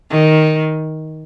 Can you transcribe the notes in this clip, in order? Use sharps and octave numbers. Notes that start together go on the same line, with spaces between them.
D#3